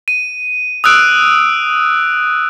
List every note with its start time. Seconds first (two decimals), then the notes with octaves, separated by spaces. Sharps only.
0.08 D#7
0.84 D#6 E6 F#6 D7